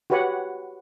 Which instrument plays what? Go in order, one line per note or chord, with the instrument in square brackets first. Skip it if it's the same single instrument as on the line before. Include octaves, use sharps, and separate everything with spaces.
[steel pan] F#4 G4 B4 C#5 F#5